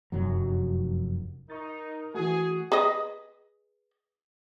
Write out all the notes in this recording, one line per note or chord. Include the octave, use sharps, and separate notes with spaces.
F1 F#2 F#3
D#4 A#4 C#6 A6
E3 A3 F#4 G#4
G#4 B4 D#5